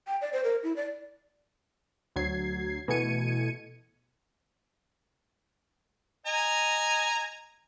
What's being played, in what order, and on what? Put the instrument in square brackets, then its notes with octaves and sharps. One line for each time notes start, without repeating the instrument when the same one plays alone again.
[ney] G5
D5
C5
A#4
E4
D5
[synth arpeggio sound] D2 F#3 G#6 C7
B2 E3 A3 G#6 C#7 D#7
[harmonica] D#5 G#5 A#5